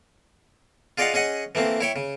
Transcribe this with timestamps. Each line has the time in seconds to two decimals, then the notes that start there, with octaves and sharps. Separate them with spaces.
0.98 F4 G#4 D5 D#5 F5 F#5
1.14 C#4 G#4 D#5 F#5
1.55 E3 A3 A#3 C4
1.80 E4 C#5 G5
1.96 C#3